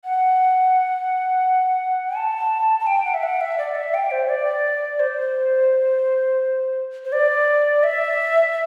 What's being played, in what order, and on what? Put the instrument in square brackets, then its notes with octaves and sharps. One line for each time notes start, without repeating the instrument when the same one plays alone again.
[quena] F#5
A5
A5
G5
F#5
E5
F#5
E5
D5
E5
G5
C5
D5
C5
C5
D5
E5